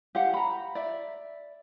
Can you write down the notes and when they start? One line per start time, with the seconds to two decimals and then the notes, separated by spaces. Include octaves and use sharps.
0.15 G4 F5 F#5
0.34 A#5 B5
0.75 D5 E5